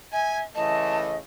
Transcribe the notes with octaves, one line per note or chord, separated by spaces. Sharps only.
E5 G#5
C#3 E3 A3 D#5 A5